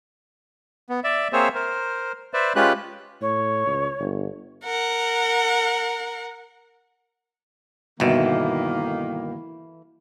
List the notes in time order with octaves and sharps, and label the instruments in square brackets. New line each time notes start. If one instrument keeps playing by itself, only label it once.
[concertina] B3
D5 E5
A#3 C4 G#4 C5 C#5 E5
A#4 C5
B4 C5 D5 E5
G#3 C#4 F4 G4 B4 F#6
[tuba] A2 [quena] C#5
[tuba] C#2
G1
[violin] A#4 F#5
[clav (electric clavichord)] G1 B2 [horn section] D#3 A#3 [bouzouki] E3 E4 A4